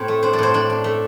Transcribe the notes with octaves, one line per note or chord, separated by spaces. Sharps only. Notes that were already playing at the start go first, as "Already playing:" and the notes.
Already playing: A2 C4
A3
D4 C5
D5
A2 C5
D4 D5
D4
A3